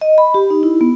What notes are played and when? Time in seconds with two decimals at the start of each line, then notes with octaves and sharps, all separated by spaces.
0.02 D#5
0.18 B5
0.34 G4
0.50 D#4
0.63 E4
0.81 B3